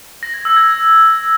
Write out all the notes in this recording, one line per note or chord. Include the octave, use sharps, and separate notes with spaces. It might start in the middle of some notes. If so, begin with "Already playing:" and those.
A#6
G#6
E6
G#6